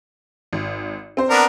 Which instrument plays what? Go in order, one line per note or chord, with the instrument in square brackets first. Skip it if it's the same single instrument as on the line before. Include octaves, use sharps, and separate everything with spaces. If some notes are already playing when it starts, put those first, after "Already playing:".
[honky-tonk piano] G#1
C4 C5
[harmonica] B3 D4 A#4